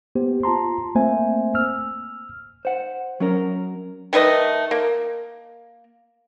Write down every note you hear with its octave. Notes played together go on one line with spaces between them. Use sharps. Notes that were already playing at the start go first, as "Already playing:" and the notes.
A#3 B3 G4 C5
F4 A5 A#5 C6
A3 A#3 C4 C5 E5 G#5
E6 F6
C5 F#5
F#3 C#4 A#4
D#3 A3 B4 D#5
A#3